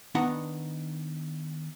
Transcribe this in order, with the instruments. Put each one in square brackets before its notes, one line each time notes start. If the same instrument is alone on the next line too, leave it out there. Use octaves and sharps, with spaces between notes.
[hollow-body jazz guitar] D#3 B3 D4 D#4 F#5 A#5